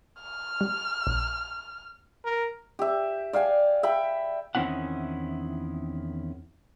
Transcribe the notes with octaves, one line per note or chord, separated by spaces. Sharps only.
F6
G3
A#1
A#4
G4 E5
D5 F5 G5 G#5
E5 G5 B5
E2 D#3 C4 C#4 E4 F#5